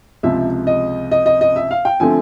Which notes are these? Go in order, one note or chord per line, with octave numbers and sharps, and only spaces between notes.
C#2 C3 F3 E5
D#5
D#5
D#5
D#5
E5
F5
G5
D3 F3 A3 C4 G#5